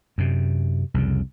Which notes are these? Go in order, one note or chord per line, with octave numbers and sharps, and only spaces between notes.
F#2 C3
C2 F2 C#3